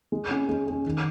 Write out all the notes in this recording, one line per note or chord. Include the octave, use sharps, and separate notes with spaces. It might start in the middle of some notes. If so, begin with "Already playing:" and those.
G#3
C#4 G#4
G#3
C#4 G#4
D#3